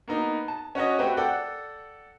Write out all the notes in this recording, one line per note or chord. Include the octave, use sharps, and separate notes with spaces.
A#3 B3 D#4
A5
C#4 F#4 C#5 D#5
A3 C4 F#4 G4 B4
A4 D5 F#5 G5